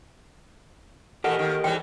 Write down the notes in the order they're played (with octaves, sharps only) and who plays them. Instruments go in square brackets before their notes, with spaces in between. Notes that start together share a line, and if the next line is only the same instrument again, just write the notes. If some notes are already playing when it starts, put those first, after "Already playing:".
[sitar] A#2 E3 A4 [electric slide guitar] G4 A#4 D#5 [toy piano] F#5
[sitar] D#3
[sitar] G#2 E3 G3 [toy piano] G5